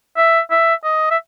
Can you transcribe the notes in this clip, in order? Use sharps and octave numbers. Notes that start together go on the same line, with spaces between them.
E5
E5
D#5
E5